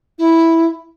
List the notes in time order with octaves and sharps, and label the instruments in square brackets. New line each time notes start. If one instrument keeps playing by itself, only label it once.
[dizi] E4